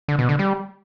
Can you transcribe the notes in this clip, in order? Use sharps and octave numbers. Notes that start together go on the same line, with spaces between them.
D3
B2
D3
G3